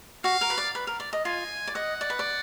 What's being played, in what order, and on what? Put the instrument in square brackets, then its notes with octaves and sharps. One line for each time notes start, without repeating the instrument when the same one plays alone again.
[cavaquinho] F#4 [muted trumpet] F5
[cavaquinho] A#4
B4
D5
B4
A#4
D5
D#5
[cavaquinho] F4 [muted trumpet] G#5
[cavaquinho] D5
[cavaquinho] D#5 [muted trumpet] F#5
[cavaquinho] D5
B4
D5